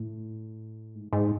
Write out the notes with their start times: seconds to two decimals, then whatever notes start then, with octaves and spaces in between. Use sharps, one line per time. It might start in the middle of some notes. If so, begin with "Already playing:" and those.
Already playing: A2
0.95 G#2
1.13 G#2